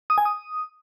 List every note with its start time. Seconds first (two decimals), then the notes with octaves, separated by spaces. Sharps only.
0.10 D#6
0.18 G#5
0.25 D#6